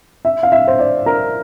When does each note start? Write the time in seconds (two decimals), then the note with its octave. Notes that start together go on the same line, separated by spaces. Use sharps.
0.25 E5
0.43 F5
0.52 E5
0.68 C5
0.79 D5
1.06 A#4